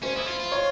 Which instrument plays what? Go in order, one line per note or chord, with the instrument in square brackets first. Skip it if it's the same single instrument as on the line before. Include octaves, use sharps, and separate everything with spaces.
[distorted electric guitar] C#4 [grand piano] C5
[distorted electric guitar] E4
F4
F4
[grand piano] C#5